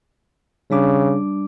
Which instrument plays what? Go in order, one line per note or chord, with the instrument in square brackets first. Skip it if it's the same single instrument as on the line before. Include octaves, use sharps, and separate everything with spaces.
[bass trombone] C#3 [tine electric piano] G3 D4 D6